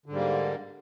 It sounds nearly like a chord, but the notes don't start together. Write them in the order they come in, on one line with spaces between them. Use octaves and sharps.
D3 G#2 G3 A#3